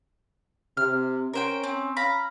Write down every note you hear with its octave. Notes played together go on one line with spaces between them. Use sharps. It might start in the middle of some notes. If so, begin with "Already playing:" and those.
C3 F6
C#4 A#4 C5 G5
C4
F5 A#5 B5